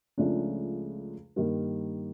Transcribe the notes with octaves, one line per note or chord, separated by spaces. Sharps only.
C#2 C#3 F3 A3 D4
G2 D#3 G3 A#3